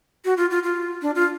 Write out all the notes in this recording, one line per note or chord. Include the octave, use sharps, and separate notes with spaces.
F#4
F4
F4
F4
D4
F4